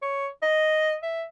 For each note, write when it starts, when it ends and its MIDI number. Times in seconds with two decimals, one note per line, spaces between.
0.02 0.27 73
0.43 0.96 75
1.03 1.24 76